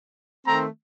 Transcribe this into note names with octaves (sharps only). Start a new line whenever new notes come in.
D#3 A3 C4 A#5